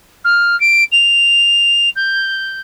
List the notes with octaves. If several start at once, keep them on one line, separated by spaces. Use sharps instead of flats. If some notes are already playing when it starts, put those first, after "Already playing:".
F6
D7
F7
G6